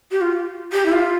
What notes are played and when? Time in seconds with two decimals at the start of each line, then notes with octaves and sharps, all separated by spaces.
0.11 G4
0.21 F4
0.72 G4
0.85 E4
0.92 F4